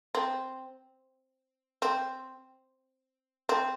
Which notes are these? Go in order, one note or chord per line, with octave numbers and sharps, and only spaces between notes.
C4
C4
C4